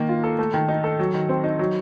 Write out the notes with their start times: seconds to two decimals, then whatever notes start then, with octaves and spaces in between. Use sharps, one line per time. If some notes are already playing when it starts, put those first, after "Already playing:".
Already playing: D#3 A#3
0.09 F4
0.24 A4
0.39 A3
0.54 D#3
0.69 D#4
0.84 A4
0.99 F#3
1.14 D#3
1.29 C4
1.44 D#4
1.59 F#3